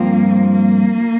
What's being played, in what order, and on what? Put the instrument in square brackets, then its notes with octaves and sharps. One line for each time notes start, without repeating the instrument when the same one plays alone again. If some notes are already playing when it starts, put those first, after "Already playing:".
Already playing: [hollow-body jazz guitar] G2 F3 C4 F4 [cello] A#3
[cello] A#3